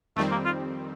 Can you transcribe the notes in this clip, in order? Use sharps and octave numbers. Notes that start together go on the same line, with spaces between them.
F2 D#3 G3 A3 C4
A#3
F4